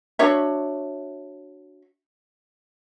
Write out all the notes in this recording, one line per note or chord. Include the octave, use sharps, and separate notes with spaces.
D4 F#4 C#5 E5